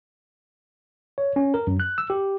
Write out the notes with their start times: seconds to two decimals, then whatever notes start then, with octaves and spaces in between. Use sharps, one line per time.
1.18 C#5
1.36 C#4
1.54 A#4
1.67 F#2
1.80 F#6
1.98 E6
2.10 G4